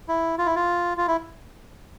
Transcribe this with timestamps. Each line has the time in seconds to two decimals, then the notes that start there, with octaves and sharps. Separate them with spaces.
0.08 E4
0.38 F4
0.46 E4
0.56 F4
0.97 F4
1.08 E4